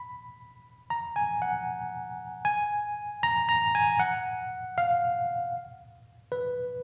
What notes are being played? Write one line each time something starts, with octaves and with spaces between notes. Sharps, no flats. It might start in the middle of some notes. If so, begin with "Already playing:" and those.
Already playing: B5
A#5
G#5
F#5
G#5
A#5
A#5
G#5
F#5
F5
B4